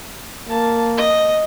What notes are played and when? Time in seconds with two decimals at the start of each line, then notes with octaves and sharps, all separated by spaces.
0.49 A#3 A5
0.98 D#5